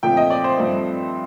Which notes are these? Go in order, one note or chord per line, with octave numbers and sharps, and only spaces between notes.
A#2 F3 A3 C4 G5
D#5
D5
C5
G2 F3 A3 C4